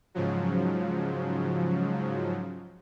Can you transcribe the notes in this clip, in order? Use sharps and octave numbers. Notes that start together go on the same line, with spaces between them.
G#2 C#3 F3 F#3